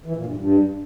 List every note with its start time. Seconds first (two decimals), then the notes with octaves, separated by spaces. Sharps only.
0.06 E3
0.16 A#2
0.26 G2
0.36 G2